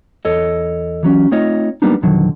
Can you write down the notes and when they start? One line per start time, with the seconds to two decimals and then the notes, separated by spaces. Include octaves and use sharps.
0.25 E2 A4 C#5 D#5
1.03 E3 F#3 C#4
1.31 A3 C4 D#4 F4 C#5 D#5
1.82 F#3 G3 A#3 B3 D4 D#4
2.02 B1 F2 D3 D#3 F#3